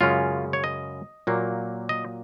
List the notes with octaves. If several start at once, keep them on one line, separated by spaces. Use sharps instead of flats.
F#2 C#3 G#3 C#4 F4
C#5
D#5
A#2 F#3 A#3
D#5